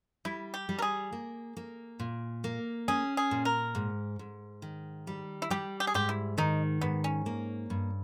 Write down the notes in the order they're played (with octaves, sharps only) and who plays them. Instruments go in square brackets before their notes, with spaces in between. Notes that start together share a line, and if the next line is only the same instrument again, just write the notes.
[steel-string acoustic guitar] G3 [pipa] E4
[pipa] G4
[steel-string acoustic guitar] G3
[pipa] A#4
G#4
[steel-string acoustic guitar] A#3
A#3
A#2
A#3
[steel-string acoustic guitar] C#4 [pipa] G#4
[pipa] G#4
[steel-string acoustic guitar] A#2
[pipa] A#4
[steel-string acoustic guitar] G#2
G#2
D#3
G3
[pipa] E4
[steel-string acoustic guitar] G3 [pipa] G4
[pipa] G4
G#4
[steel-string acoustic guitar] G#2 [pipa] G4
[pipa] E4
[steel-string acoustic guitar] D#3 [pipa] D#4
[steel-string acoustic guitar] G#2 [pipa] B3
[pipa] C#4
[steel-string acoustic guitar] A#3
G2